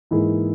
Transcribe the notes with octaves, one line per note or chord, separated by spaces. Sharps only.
G#2 E3 A#3 E4 G#4